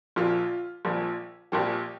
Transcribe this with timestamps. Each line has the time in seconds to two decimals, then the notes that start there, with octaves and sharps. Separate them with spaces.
0.16 A#1 A#2 F3 F4
0.85 A#1 A#2 F3
1.52 A#1 A#2 F3 G4